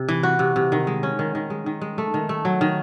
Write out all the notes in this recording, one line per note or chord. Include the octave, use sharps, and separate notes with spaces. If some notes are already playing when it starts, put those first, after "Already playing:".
Already playing: C3
E3
F#4
C3
C3
D#3
G#3
C#4
D#3
D#3
G#3
D#3
G#3
A3
D#3
A3
F#3
D#3